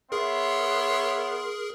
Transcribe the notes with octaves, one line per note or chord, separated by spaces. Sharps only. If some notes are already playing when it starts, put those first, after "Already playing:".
B3 G#4 A#4 C#5 E5 C6